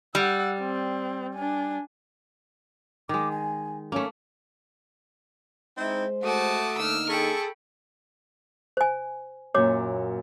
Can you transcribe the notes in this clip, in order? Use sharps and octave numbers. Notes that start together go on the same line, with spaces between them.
G3 F#5 E6
C4
D4 G#5
D#3 G#3 D6
G#5
A3 A#3 C#4
G#3 C4 D#4 E4 C5
A3 F#4 A5 D6 D#6
D3 A#3 D#4 E6 F6
G#4 A4 G5 B5 C#6
C5 G#5
F#2 A#2 C#5 D6